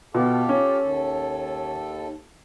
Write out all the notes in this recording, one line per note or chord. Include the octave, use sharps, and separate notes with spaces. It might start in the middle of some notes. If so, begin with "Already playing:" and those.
B2 F4 G4 A4
C#4
D#2 A4